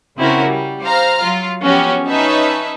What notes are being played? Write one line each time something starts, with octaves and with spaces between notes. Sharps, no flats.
C#3 C4 C#4 E4 F#4 A#4
G3
C5 F5 A#5 F6
F#3 F4
F3 B3 C#4 F#4 G4
C#4 D#4 B4 E5 A5